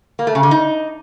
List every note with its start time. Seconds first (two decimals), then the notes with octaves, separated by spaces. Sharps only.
0.19 A#3
0.27 A3
0.35 C#3
0.43 D3
0.51 D#4